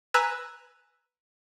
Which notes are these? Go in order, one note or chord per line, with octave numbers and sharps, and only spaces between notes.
B4 G#5 A#5 E6 F#6